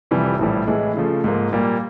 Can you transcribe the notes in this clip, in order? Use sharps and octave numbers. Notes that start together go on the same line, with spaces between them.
F1 F2 C3 E3 G3
A#1 A2 E3 G3
A2 E3 G#3
C#3 F3 A3
G#2 F3 A#3
A#2 G3 A#3